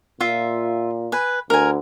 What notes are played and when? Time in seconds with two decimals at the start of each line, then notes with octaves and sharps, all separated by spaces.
0.21 A#2 F4 E5
1.12 B4 G#5
1.50 D2 A#4 G#5